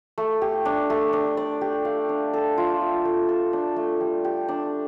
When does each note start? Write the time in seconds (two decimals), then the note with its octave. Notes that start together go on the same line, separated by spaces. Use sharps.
0.18 A3
0.42 G4
0.65 D4
0.90 A3
1.13 D4
1.37 D5
1.61 G4
1.85 F5
2.09 D4
2.34 A4
2.58 F4
2.81 E5
3.05 A3
3.29 A4
3.53 D4
3.76 A3
4.01 G3
4.25 G4
4.48 D4